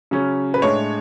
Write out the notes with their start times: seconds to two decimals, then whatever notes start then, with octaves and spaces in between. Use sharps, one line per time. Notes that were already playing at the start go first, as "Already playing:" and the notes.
0.11 C#3 F#3 C#4
0.54 B4
0.62 A2 G#3 D4 C#5